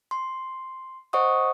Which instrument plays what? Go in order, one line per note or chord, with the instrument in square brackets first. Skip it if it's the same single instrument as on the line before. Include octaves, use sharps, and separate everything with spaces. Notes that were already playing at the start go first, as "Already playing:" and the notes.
[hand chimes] C6
C5 D#5 F#5 C#6 D#6